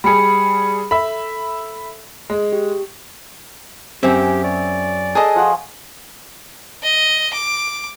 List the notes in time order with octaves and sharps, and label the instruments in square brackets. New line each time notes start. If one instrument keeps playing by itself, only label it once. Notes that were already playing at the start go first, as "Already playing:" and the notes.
[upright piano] G3 G#4 [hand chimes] B5 C#7
[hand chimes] A4 [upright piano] E5 B5
[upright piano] G#3
[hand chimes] G4
[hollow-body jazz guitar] F#2 C4 [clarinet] G4 [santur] G#4 [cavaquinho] E5
[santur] C#5 [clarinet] D5
[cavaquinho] G#4 A4 D#5 [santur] B4 G#5 A#5
[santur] F3 F#4 F#5
[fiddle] D#5
D6